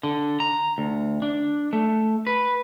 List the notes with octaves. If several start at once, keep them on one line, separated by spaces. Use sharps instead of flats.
D3
A#5
D2
D4
A3
B4